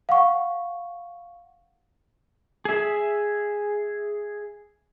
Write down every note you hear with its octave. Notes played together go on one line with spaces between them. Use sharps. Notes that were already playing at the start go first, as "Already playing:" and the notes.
F5 F#5 C#6
G#4 E5